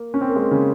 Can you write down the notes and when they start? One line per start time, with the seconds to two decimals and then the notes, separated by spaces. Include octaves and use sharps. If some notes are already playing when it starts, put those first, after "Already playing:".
Already playing: A#3
0.14 C#4
0.21 C4
0.29 A#3
0.36 G#3
0.51 C#3